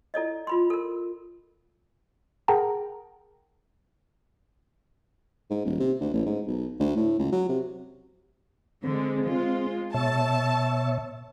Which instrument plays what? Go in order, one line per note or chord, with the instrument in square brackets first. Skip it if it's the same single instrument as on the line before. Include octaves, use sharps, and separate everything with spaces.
[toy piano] E4 A4 D5 D#5
F4 B5 C6
A4 A#4
[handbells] G#4 A#4 F#5 G5 A5 A#5
[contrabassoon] G#2
D#1
C3
D2
A1
G#2
B1
D2
A2
C#2
F#3
C3
[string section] D3 G#3 [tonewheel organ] C4
[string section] G#3 F4
[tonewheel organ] B2 C#5 E5 [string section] A5